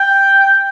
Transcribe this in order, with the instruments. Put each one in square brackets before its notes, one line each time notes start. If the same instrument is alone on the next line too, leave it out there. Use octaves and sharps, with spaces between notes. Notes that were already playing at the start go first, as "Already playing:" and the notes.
Already playing: [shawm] G5